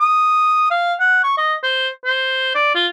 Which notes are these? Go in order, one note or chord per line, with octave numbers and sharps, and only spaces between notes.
D#6
F5
F#5
C#6
D#5
C5
C5
D5
F4